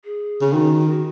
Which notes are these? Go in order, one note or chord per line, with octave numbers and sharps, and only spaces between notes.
G#4
C#3
D#3 F#4
F#4